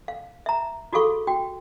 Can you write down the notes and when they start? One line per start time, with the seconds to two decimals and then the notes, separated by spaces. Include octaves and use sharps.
0.08 F5
0.46 E5 A#5
0.93 F4 F#4 G#4 A4 F5 C#6
1.27 F#4 G5